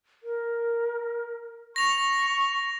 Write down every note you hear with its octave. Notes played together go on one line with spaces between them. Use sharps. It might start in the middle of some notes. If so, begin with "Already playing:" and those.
A#4
C#6 A#6 F7